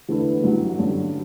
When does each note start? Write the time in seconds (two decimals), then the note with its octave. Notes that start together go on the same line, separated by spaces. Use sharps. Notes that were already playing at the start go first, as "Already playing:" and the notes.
0.09 E2 D3 A3 E4 B4
0.43 A1 G2 F#3
0.78 G2 D3 F#3 C#4